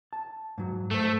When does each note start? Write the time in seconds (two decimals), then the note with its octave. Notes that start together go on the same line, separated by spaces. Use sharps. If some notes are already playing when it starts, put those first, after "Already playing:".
0.13 A5
0.58 G#2 F#3
0.91 G#2 A3 C5